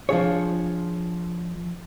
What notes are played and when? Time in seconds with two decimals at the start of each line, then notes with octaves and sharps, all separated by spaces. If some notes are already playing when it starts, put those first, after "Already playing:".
0.09 F3 D4 G#4 C#5